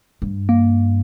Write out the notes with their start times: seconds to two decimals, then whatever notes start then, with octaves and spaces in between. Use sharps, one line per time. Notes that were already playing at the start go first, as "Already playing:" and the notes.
0.22 G2
0.49 A#3